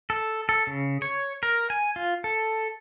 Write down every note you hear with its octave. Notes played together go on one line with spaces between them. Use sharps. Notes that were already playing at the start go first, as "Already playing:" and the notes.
A4
A4
C#3
C#5
A#4
G#5
F4
A4